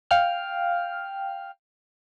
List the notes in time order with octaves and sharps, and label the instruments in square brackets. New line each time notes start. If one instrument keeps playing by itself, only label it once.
[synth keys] F5 G5 F6